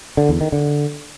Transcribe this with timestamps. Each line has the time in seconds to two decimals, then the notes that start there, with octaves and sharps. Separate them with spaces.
0.17 D3
0.29 E2
0.41 D#3
0.52 D3